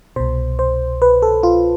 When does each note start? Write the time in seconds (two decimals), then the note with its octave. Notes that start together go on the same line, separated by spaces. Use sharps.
0.16 C2 B2 C5
0.59 C5
1.02 B4
1.22 A4
1.43 F4